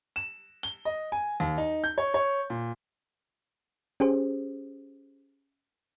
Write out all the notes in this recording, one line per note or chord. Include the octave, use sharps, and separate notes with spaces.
E7
G7
D#5
G#5
D#2
D#4
G6
C#5
C#5
A#2
C#4 G4 G#4 C5